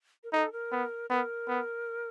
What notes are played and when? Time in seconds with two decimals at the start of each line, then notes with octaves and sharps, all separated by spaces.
0.24 A#4
0.32 D#4 A4
0.52 A#4
0.72 B3
1.09 B3 A#4
1.48 B3